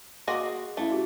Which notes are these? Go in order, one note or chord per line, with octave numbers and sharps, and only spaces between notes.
A#3 F#4 G#4 D#5 C6 D6
A3 C#4 E4 F5
F#4 G4